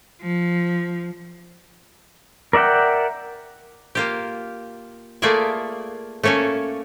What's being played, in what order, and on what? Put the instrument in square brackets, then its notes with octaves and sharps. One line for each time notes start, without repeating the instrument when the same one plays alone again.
[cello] F3
[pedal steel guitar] A#4 D5 E5 F#5 G5
[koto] A#3 F4 G4
A3 A#3 F4 G#4 D5 E5
A3 A#3 C#4 A4 G#5